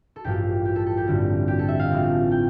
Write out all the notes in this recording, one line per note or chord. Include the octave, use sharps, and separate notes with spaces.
A4
A1 G2 F3 A#3 G4
G4
A4
A4
G4
A1 G2 D3 G3 C4
G4
A4
E5
F5
A1 A2 F3 C4
G5